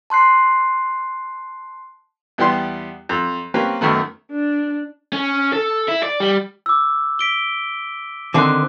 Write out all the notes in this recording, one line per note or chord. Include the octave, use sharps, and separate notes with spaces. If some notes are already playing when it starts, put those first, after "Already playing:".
A5 C6 F#6 C7
E2 G3 B3 G4 C6
F2
A#3 C4 C#4 G4 B4
F#2 D#3 A3 B3
D4
C#4
A4
E4
D5
G3
D6 E6
B6 D7 G7
D3 D#3 C4 D6 F#6